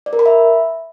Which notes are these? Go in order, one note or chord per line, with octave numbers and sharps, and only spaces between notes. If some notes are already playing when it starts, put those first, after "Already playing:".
D5
A#4
B5
E5